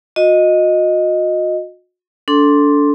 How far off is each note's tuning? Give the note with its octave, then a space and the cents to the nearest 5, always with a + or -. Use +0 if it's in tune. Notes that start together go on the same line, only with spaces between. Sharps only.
F#4 -40 D#5 +0
D4 -25 A4 +0 C6 +10